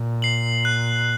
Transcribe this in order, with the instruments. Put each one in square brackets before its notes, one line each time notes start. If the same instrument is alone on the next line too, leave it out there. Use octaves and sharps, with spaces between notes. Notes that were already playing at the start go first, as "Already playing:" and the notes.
Already playing: [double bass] A#2
[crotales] C7 F#7
F#6